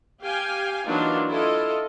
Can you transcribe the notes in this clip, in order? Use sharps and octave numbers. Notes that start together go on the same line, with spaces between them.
G4 F5 G5 G#5
E3 F#3 A#3 D4 D#4 F4
E4 F4 A4 D#5